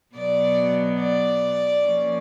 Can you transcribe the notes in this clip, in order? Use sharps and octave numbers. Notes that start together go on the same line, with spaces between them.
B2 F#3 B3 D5
D5
F3 A#3 C#4